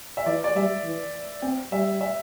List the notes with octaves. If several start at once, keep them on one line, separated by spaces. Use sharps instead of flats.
E5
E3 D5
D5
G3 E5
E3
C4 G5
G3 E5
E5